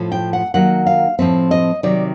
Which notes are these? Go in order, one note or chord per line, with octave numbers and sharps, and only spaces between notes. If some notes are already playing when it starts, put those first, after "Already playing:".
Already playing: A2 F3 A3
G5
F#5
D#3 F#3 A#3 F#5
F5
A2 F3 A3 C4 E5
D#5
C3 D#3 F#3 D5